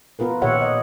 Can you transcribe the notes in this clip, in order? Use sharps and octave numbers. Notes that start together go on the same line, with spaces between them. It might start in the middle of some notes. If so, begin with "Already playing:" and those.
B3 F4 A#4 B4
A#2 D#3 G4 C#5 E5 F#5
D#5